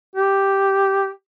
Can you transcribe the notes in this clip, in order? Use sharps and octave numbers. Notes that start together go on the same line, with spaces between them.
G4